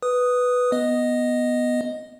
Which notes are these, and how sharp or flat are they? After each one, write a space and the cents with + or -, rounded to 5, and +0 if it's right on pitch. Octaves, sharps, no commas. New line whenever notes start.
B4 +0 D#6 +0
B3 +0 D#5 +0